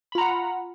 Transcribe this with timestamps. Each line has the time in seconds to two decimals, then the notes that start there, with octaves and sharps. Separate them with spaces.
0.12 B5
0.15 F4
0.18 A#5
0.21 F#5